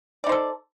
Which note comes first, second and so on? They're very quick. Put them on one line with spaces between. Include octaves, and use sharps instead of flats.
D5 D#4 C5 A4